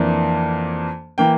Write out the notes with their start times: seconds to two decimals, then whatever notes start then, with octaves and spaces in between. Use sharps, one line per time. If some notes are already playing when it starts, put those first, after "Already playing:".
Already playing: F2 E3 A#3 D4
1.18 E3 A#3 G5